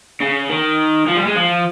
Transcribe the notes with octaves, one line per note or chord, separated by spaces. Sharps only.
C#3
D#3
F3
G3
G#3
F3